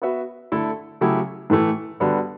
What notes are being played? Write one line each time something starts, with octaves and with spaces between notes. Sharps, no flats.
B3 F#4 B4 E5
D3 A3 E4 A4
C#3 F#3 A3 E4 G4
A2 E3 A3
D3 G3 B3 F#4